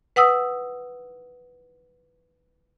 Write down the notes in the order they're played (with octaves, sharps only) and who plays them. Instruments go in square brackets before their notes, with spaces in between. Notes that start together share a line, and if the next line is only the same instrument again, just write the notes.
[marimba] B4 F#5 D#6 E6